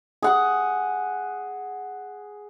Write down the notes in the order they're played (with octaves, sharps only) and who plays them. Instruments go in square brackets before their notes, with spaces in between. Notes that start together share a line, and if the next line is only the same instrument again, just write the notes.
[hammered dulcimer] G#4 F#5